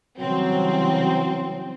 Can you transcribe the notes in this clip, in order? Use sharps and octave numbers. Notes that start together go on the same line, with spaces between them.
C#3 E3 F#3 G3 C4